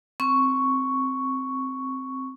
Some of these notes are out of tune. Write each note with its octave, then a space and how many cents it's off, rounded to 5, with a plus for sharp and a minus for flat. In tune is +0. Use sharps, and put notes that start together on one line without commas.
C4 +0 C#6 +5